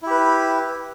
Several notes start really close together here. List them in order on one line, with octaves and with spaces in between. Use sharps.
E4 G4 B4